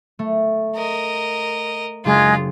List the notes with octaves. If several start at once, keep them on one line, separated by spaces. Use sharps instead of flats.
A3
A#4 D#5
F#1 G#3 D4 F4 G#4